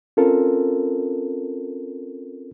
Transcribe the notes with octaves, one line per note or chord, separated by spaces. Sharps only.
C4 C#4 F4 A4 A#4